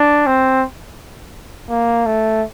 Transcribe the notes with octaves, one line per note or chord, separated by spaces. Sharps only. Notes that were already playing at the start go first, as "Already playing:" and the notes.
Already playing: D4
C4
A#3
A3